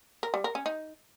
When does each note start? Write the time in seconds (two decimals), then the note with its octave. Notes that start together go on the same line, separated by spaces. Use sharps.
0.23 A#4
0.34 G3
0.44 A#4
0.55 C#4
0.66 D#4